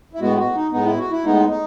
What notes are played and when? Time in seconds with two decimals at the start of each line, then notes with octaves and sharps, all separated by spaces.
0.13 E4
0.20 A2 G#3 B3 F#4
0.38 F#4
0.55 D#4
0.71 A2 G#3 B3 D#4
0.85 E4
0.98 F#4
1.11 E4
1.24 A2 G#3 B3 D#4
1.49 D#4